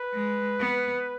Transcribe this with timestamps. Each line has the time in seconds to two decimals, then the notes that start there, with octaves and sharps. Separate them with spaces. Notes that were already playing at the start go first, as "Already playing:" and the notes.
Already playing: B4
0.14 G#3
0.60 B3